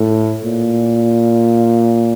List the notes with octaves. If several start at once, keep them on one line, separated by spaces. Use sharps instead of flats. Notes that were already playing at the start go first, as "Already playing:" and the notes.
Already playing: A2
A#2